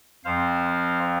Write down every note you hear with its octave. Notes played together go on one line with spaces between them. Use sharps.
F2 F3 C4 C5 F5